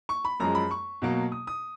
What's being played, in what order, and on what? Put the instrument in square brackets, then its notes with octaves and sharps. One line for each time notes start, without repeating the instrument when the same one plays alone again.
[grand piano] C#6
B5
F#2 F3 G#3 A#5
B5
C#6
B2 F#3 A#3
D#6
D#6